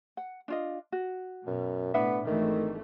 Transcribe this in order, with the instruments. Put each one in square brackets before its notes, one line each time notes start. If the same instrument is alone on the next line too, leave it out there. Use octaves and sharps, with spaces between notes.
[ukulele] F#5
D4 F4 D#5
F#4
[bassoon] F#2 [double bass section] B2
[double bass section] A2 [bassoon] B3 [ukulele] D4 B4 E5
[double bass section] G#1 E3 A3 [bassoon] D#3